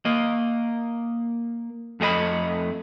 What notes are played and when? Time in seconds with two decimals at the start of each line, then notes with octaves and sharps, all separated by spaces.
0.05 A#3 D#5
2.00 F2 A3 G#4 D#5 B5